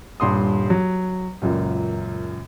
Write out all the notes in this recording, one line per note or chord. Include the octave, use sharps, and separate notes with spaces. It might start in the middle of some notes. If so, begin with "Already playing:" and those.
D#1 G2 C6 D#6
F#3
C#2 F#2 A#2